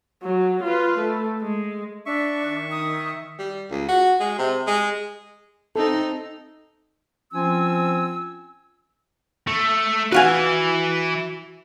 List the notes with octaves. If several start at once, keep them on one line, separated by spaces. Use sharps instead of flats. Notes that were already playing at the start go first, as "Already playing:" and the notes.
F#3
F4 B4
A3
G#3
D4 E5 C#6
D#3
D#6
G3
C#2
F#4
G#3
C3
G#3
C4 D#4 A4
F3 C4 C#4 F4 G#5 E6
A3
E3 F#4 B4 F5 G#5